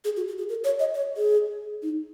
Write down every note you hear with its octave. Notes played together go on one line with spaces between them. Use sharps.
G#4
F#4
F#4
G#4
A#4
C#5
D#5
C#5
G#4
D#4